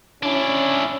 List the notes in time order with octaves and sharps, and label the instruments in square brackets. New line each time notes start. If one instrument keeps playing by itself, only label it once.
[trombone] C#4 [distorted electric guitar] D4 E4